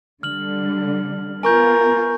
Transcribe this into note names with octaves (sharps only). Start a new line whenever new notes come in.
D3 G3 F6 F#7
B3 F4 A#4 G#5 C#6 G6